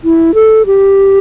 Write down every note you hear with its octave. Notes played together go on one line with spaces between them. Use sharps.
E4
A4
G4